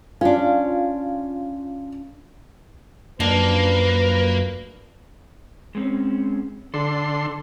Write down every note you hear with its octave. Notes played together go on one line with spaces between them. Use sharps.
C#4 D4 F4
F#2 F3 A#3 D4 B4
G#3 C4 C#4
D3 A4 C6